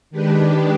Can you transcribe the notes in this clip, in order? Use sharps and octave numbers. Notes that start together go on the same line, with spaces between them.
D#3 G#3 D4 G4 B4